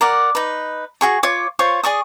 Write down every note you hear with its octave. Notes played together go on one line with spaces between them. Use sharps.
A#4 D5 F#5
D#4 B4
F#4 G#4 C#6
F4 C#5 D6
F4 C5 C#5 C#6
G#4 D5 C#6 D#6